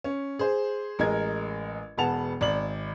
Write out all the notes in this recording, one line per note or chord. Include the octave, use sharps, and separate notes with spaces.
C#4
G#4 C5
A1 G#3 A#4 G#6
E1 B3 G#4 F#5 A5 F7
G#1 D5 F#7